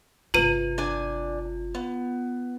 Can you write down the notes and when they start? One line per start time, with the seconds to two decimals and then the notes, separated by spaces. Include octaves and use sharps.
0.34 G1 C3 F4 B4 D#7 F#7
0.78 D4 G#5
1.75 B3